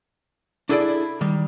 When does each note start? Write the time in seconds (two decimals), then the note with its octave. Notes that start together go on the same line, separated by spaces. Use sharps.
0.69 D4 E4 G#4 A4 C5 D5
1.21 D#3 G3